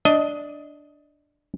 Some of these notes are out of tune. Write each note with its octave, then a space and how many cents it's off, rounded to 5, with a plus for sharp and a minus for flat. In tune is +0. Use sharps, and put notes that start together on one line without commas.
D4 +0 D#5 +15